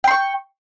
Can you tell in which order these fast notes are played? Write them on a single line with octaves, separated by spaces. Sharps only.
G5 C6 C#6